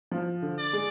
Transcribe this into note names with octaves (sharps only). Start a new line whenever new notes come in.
F3
D3
D5
G#3